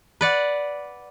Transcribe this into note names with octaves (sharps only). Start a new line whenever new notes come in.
B4 D5 F#5